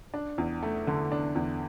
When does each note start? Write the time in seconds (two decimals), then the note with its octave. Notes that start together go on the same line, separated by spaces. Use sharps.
0.14 D4
0.38 E2
0.63 A3
0.87 D3
1.12 D4
1.35 E2